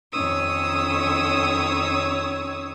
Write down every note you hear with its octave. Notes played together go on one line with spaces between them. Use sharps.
F2 D#3 C#4 C#5 D#6 E6